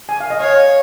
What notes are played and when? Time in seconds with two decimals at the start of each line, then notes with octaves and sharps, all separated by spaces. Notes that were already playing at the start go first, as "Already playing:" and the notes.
0.09 G#5
0.20 F5
0.30 D#5
0.41 C#5 F5